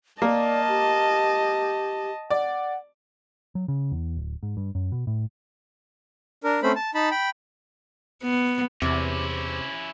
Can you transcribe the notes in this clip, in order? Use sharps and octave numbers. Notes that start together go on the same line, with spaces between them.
A#3 D5 D#5 A5
G4
D5 F#5
F#3
C#3
E2
D1
G#2
G2
F#2
B2
A2
D4 A#4
A3 C4 C#4 C5 B5
A5
D#4 A5 B5
G5 B5
B3
E2 C3 C#4 E4